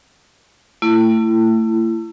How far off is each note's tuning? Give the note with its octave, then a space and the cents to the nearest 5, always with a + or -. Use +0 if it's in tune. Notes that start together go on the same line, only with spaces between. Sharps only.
A3 +35 E4 +25